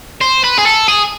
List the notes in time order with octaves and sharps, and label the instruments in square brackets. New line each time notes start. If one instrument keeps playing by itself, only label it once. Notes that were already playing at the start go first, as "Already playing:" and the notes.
[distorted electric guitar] C5
B4
G#4
A4
G#4